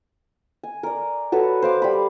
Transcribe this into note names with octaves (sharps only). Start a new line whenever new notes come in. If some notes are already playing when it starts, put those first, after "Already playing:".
G#5
A#4 D5
F#4 A4 B4 C#5
C5 F5 D6
G3 B5